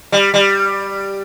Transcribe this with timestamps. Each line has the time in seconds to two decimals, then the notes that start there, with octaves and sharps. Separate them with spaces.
0.12 G3
0.34 G3